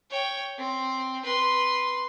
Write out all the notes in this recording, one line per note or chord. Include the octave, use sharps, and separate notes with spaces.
C#5 G5
C4
B4 C6